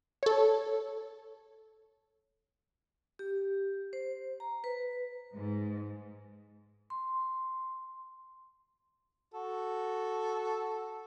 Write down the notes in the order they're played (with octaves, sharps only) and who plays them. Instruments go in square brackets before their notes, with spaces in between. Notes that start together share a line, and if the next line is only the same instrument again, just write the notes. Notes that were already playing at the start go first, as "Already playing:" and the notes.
[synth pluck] A4 C#5
[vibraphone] G4
C5
A#5
B4
[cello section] G#2
[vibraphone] C6
[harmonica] F#4 A4